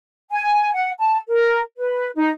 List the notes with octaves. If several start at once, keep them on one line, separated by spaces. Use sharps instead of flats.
G#5
F#5
A5
A#4
B4
D#4